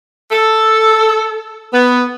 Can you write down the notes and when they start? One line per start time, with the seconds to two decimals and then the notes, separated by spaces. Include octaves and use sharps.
0.32 A4
1.73 B3